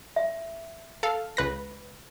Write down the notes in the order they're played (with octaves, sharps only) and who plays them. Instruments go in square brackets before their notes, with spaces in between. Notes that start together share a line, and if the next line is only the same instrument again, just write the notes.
[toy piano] E5
[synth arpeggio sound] A4 F5
C#2 B4 A#6